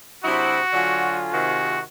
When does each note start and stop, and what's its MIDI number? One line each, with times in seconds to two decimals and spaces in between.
0.24 0.58 48
0.24 0.58 54
0.24 0.61 62
0.24 0.58 64
0.24 1.17 66
0.24 0.61 72
0.24 0.61 87
0.73 1.28 50
0.73 1.28 54
0.73 1.75 65
0.73 1.75 80
1.33 1.79 48
1.33 1.79 51
1.33 1.82 66